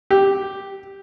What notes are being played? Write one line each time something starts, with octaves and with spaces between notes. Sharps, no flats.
G4